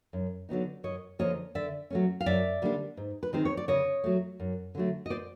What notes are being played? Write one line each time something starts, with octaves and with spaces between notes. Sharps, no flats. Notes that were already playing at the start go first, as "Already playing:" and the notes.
F#2
D3 F#3 B3 D#4
F#2 C#5 D#5
D3 F3 A#3 C#5 D#5
D3 D5 E5
F#3 A3 C#4
F5
F#2 D5 E5
D3 G3 A#3 D4
G#2
B4
D#3 G#3 C4 D#4 C5
C#5
D5
C#3 C#5 D#5
F#3 A3
F#2
D3 F#3 A3
D#5
C5 D5